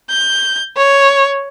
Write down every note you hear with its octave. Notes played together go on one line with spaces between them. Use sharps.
G6
C#5